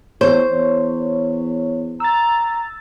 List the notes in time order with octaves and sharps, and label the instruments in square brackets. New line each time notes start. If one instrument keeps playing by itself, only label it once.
[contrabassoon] E2 [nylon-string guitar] C5 [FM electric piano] C#5
[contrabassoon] E2
[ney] A#5 [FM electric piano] E6 A6